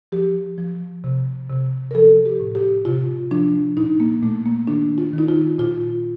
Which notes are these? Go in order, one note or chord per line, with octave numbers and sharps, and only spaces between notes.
F3 G4
F3
C3
C3
A#4
F3 A4
G4
A2
G4
C3 F4
F3 D4
A#2 D#4
A#3
A#2 A3
A#3
D#3 D4
F4
D#3 D#4
F4
A#2 F4